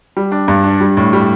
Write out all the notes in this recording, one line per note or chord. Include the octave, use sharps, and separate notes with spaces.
G3
D4
G2
D4
G3
A2
G3